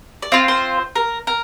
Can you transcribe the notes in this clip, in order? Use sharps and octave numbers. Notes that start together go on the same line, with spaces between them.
D5
C4 F4 F5
C5
A#4
A#4